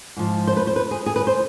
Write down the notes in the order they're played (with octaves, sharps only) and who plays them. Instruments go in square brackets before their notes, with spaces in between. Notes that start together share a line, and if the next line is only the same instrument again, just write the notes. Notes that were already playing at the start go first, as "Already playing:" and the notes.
[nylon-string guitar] G#2 F3
C5
B4
C5
B4
G#4
G#4
B4
C5